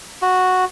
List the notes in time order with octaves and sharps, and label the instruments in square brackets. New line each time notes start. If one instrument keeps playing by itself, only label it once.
[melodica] F#4